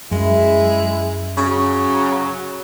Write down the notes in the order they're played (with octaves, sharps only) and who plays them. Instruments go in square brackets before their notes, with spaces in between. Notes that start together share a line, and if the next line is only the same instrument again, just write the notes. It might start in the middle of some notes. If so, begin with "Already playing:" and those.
[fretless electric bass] F#2 [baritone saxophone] G#3 [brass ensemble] E4 G#4 E5
[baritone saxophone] C#3 [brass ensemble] F#3